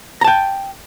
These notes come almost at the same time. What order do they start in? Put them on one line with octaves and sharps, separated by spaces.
A#5 A5 G5